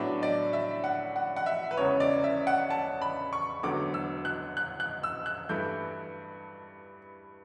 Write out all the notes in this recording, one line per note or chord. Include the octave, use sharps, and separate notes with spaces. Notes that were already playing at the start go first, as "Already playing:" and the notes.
Already playing: A2 F#3 B3 D4 E5
D5
E5
F#5
F#5
F#5
E5
B4
E1 E2 C#3 C#5
D5
E5
F#5
A5
B5
C#6
E1 D2 D3 F#3 B3 D6
E6
F#6
F#6
F#6
E6
F#6
G2 E3 A3 E4 G6